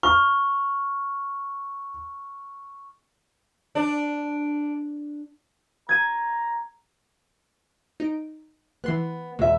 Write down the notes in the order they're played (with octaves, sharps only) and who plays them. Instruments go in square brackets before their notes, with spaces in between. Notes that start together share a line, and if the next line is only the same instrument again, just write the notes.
[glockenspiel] C#6 [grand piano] F6
[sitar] D4
[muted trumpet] A#5 [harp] G#6 D#7
[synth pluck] D#4 D7
[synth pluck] E3 C6 F#6 [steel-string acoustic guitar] B3
[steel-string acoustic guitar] E2 E5 [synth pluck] B2 G#3